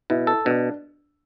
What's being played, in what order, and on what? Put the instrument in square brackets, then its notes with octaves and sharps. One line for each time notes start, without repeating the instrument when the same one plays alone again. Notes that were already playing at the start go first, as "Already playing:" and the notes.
[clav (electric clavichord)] B2 [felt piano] E4
[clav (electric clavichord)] A4
[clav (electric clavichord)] B2 [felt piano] D4